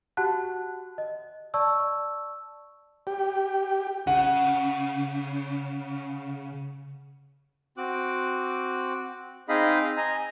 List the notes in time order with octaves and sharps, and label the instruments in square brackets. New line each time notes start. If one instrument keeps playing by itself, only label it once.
[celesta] F#4 G4 F#5 A5 F#6
D#5
D5 A5 C#6 E6
[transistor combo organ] G4
[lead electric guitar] C#3 [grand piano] F#5
[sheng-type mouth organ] C4 F#4 D6 F#6
C4 D#4 G#4 D#5 F5 B5
D#5 G#5 A#5